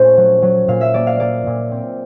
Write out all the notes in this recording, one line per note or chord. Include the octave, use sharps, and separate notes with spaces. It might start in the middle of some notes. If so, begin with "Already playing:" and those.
Already playing: A#2 A3 C#4 C5
F#3
F#3
A#2 F5
E5
A#3 D5
F5
A#3 D5
A#2
C4